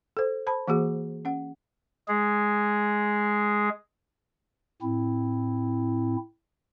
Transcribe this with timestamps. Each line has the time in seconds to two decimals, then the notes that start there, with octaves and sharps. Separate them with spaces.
0.17 A4 C5
0.47 C5 A5 B5
0.68 E3 A#3 F#4 G#4
1.25 C#4 F#5
2.08 G#3 G#4
4.82 A2 C4 E4